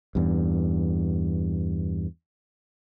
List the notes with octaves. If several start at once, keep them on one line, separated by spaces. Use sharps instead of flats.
E2 G2